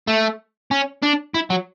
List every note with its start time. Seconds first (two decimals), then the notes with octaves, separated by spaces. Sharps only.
0.07 A3
0.71 C#4
1.02 D4
1.34 E4
1.50 F#3